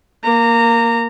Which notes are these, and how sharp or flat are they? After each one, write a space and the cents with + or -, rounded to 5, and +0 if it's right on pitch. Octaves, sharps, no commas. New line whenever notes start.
A#3 +0 A#5 -25